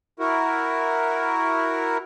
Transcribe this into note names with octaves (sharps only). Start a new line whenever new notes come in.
E4 F#4 A#4